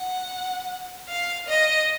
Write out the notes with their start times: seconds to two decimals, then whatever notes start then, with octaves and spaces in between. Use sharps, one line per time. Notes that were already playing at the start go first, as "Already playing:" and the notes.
Already playing: F#5
1.09 F5
1.49 D#5